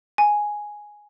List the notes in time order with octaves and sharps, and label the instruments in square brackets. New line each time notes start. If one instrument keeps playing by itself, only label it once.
[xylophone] G#5